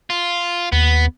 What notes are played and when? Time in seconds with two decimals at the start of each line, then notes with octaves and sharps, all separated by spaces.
0.10 F4
0.72 D#2 B3